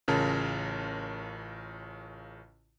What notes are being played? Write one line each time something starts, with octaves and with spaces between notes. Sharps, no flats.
A1 C#3 F4 A#4 C#5 A5